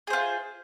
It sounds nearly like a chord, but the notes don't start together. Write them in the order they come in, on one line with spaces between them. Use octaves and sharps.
G#4 C5 F4